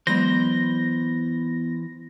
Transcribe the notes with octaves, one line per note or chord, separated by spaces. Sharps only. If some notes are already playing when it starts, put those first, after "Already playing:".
E3 F#3 G#3 B3 C5 B5 A#6